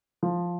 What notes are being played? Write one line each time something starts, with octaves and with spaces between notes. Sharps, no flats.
F3